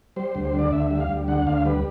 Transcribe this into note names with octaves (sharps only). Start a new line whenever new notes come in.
G3 C5
D2 C5
C5
D3
D5
D2 E5
G3 E5
F5
D2
D3 F#5
D2 F5
G3 B4